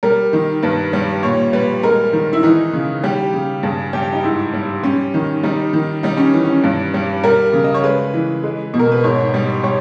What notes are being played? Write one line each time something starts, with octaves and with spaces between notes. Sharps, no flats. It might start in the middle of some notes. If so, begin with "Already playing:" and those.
G3 A#4
D#3
G2 B4
G3
A#2 C#5
G3 B4
G#3 A#4
D#3
E4
E3 D#4
C#3
G3 G4
C#3
G2 G#4
G3 G4
D#4
G#2 E4
G3
G3 C#4
D#3
G3 D#4
D#3
G3 D#4
C#4
E3
C#4
G2
G3
G3 A#4
C#3
D#5
C#5
G#3 B4
E3
G#3
B2
A#4
B4
G#2 C#5
G3
G3 C#5